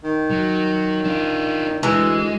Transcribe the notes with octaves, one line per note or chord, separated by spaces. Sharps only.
D#3
F#3
D4 F4
D2 E3 G#3